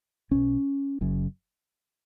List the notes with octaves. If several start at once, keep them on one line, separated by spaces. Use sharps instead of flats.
B1 B2 C#4
F#1 F#2 C#3